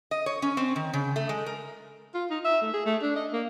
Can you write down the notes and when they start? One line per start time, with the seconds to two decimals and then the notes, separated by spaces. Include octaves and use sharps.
0.11 D#5
0.26 C#5
0.42 C#4
0.57 C4
0.76 D#3
0.93 C#3
1.16 A3
1.29 G#3
1.46 A#4
2.14 F4
2.30 D#4
2.44 E5
2.61 A3
2.73 G#4
2.86 A3
3.02 D4
3.16 D#5
3.33 A#3